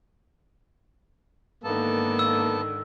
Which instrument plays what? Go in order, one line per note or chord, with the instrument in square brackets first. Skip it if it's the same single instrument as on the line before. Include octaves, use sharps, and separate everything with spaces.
[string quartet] G#2 D3 D#3 [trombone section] A#3 [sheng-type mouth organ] B3 A4 A5
[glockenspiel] E6